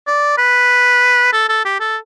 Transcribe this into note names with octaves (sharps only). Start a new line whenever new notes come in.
D5
B4
A4
A4
G4
A4